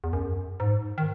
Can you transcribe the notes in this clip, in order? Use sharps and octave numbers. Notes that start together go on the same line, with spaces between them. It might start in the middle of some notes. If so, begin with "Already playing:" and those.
E2
F#2
G#2
D#3